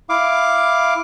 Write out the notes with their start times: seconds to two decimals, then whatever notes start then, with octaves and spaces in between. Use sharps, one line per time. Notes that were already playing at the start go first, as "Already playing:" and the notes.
0.09 E4 F5 D6